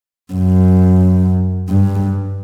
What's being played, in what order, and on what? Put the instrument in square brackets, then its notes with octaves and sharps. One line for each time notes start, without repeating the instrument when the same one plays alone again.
[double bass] F#2
G2